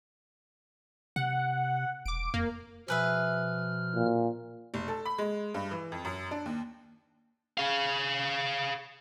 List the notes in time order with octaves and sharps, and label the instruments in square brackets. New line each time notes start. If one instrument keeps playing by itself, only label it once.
[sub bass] C3 [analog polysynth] F#5
[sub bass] E1 [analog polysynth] D6 D7
[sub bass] F2 [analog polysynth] A#3
[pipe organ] B2 F3 F6 [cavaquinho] G#4 B4 E5
[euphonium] A#2
[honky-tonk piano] F1
A4
B5
G#3
G2
E3
F2
F#2
D4
D#2
[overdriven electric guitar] G#4 F5